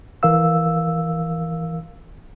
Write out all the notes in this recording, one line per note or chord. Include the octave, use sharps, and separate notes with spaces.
E3 A#4 F5 E6